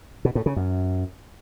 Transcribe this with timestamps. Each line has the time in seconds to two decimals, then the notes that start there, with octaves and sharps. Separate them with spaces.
0.25 B2
0.35 A2
0.46 C#3
0.56 F#2